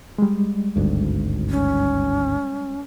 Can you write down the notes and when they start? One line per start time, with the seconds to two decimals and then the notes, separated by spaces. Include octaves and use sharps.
0.18 G3 G#3
0.76 G#1 D2 G2
1.50 C#4